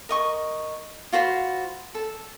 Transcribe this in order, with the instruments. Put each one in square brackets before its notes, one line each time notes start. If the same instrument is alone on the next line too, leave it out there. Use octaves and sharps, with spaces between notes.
[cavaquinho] A#4 D#5 C#6
F4 F#4 C5 B5
A4